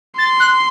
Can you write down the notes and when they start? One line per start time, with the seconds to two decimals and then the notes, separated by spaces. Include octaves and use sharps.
0.18 C6 A6
0.40 F#6